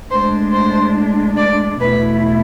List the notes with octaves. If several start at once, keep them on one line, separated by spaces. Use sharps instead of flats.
A2 G#3 D4 C5 C6
C5 C6
D5 D6
E2 B2 A3 E4 B4 B5